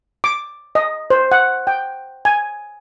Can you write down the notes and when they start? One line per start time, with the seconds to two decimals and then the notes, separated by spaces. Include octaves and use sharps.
0.24 D6
0.75 D#5
1.10 C5
1.32 F#5
1.67 G5
2.25 G#5